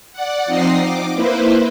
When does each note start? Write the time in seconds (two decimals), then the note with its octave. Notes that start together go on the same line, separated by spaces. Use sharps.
0.12 D5 F#5
0.46 F3 C4 D#4 D#5 A#6 C7
0.79 D6
1.15 A#3 E4 B4 C5